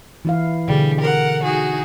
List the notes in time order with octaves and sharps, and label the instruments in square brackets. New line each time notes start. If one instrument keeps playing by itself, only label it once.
[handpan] E3 E4 F5
[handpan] B2 D3 G#4 [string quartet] G3
[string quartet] A#4 F#5
D#4 F#4 G#4